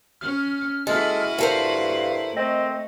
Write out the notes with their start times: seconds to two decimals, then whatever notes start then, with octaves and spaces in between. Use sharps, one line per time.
0.21 C#4 F6
0.87 G#3 E4 F#4 A4 B4
1.38 G2 A4 A#4 C5 F5
2.36 A3 C4 D#5